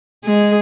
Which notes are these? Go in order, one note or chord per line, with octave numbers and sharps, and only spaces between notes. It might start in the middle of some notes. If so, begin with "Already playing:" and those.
G#3 G#4